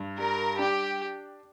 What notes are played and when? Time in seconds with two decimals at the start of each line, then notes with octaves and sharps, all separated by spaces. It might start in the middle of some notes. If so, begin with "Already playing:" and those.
Already playing: G2
0.18 G3 A#4
0.59 D4 G4